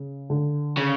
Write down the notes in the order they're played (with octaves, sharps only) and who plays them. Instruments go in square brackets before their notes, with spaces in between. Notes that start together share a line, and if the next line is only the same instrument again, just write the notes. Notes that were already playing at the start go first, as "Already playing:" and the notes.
Already playing: [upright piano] C#3
D3
[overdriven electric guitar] C#3